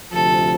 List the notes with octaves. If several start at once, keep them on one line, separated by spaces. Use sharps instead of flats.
D2 C3 F3 A4